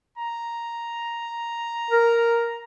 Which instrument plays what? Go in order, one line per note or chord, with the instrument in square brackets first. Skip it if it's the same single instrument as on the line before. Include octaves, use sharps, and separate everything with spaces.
[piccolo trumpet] A#5
[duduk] A#4